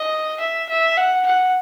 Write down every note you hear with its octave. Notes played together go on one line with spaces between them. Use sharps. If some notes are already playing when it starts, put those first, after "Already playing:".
Already playing: D#5
E5
E5
F#5
F#5